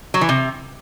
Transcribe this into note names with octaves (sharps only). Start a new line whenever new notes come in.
F#3
E3
C3